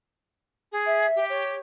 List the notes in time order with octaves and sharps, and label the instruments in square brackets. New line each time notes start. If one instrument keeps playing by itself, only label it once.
[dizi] G#4
[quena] E5
[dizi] G4
[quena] C#5